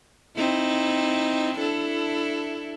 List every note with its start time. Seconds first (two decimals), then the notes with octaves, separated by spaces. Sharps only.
0.36 C4 D#4 E4
1.57 D4 E4 A4